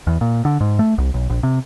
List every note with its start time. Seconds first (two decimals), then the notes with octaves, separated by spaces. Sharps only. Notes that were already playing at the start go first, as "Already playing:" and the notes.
0.07 E2
0.21 A#2
0.45 D3
0.61 G#2
0.79 A3
0.98 C2
1.14 B1
1.30 A#1
1.43 C3